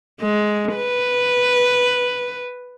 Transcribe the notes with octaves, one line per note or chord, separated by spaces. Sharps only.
G#3
B4